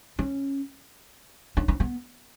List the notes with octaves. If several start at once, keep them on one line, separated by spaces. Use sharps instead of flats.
C#4
C#4
C#4
B3